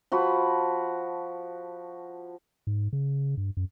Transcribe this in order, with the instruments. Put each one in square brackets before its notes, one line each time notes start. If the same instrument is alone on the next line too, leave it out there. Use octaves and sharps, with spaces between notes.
[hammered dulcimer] F3 F#4 B5
[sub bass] G#2
C#3
G2
F#2